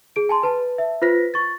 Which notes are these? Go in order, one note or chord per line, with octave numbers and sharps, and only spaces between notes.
G#4 D7
G#5 A5 C6
B4 A5
E5
F4 B4 C5 A#6 B6
C#6 A6